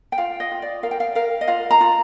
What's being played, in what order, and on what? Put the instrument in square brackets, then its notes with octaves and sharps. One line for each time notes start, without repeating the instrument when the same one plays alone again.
[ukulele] G5
F4 F5
D#5
F4
D5
A#4 F5
G5
F5
A#4 F5
D#5
F4 F5
A#5
F4